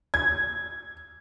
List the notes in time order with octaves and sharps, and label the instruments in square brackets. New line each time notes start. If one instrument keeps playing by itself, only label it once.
[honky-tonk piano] G#6